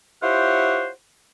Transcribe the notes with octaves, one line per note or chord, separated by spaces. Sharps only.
E4 F4 G4 C5 C#5 F#5